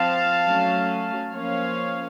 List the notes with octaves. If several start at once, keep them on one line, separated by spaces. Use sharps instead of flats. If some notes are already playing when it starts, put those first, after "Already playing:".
Already playing: F3 C4 F5 A5
F#3 A3 C#4
F3 A#3 C#4 C#5 F5